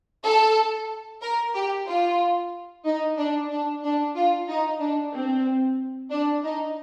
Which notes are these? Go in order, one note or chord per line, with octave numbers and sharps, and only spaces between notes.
A4
A#4
G4
F4
D#4
D4
D4
D4
F4
D#4
D4
C4
D4
D#4